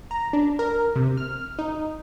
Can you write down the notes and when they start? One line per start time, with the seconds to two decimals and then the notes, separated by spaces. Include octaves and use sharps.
0.11 A#5
0.33 D4
0.59 A#4
0.96 C3
1.17 F6
1.59 D#4